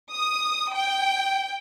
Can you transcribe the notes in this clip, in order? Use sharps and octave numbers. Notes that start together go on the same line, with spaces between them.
D#6
G5